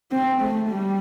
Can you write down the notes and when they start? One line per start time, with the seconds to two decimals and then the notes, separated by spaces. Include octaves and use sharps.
0.12 C4
0.41 A3
0.70 G3